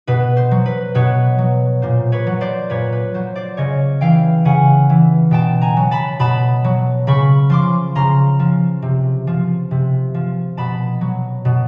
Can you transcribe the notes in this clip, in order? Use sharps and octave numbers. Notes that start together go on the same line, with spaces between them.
B2 B4
C5
F#3
B4
B2 B4 C#5
F#3
A#2 C5
B4 C#5
F#3
C5 D5
A#2 B4 C#5
B4
F#3 C5
C5 D5
C#3 C#5 D#5
E3 F5 G5
C#3 F#5 G#5
E3
B2 G5 A5
G#5 A#5
F#3
A5 B5
B2 A5 B5
F#3
C#3 B5 C#6
F3 C6 D6
C#3 A#5 C6
F3
C3
F3
C3
F3
B2 A5 B5
F#3
B2